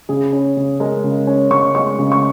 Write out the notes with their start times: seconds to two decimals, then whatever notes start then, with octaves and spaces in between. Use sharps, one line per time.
0.09 C#3 G#4
0.33 C#4
0.57 C#3
0.80 G#3 A#4
1.04 C#3
1.27 C#4
1.51 C#3 C#6
1.75 G#3 C#6
1.99 C#3
2.12 C#6